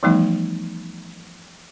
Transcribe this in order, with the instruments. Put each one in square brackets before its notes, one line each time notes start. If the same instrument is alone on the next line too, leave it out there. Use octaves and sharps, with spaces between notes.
[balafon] E3 F3 G3 A3 B3 D#4